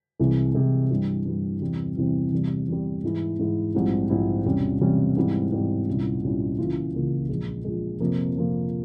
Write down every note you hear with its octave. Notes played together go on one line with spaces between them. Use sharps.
C2 C3 E3 G#3
C2 C3 E3 G#3
G2 E3 G3
G2 E3 G3
E2 C3 E3 G3 C4
E2 C3 E3 G3 C4
E2 C3 G3
E2 C3 G3
G#2 E3 G#3 E4
G#2 E3 G#3 E4
A#1 G#2 G3 C4 E4
A#1 G#2 G3 C4 E4
E1 E2 C3 G3 C#4
E1 E2 C3 G3 C#4
G#2 E3 G3 C4
G#2 E3 G3 C4
C2 A#2 G3 C#4 E4
C2 A#2 G3 C#4 E4
C#2 C#3 E3 A#3 F4
C#2 C#3 E3 A#3 F4
A#1 A#2 G#3
A#1 A#2 G#3
F2 C3 F3 A#3 F4
F2 C3 F3 A#3 F4